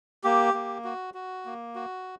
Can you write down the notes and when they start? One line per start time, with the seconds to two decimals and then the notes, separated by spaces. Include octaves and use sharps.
0.24 A#3 G4
0.54 A#3
0.85 F#4
1.14 F#4
1.45 A#3
1.75 F#4